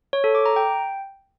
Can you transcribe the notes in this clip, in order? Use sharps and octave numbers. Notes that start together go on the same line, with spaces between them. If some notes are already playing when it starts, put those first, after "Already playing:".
C#5
A4
D6
A#5
G5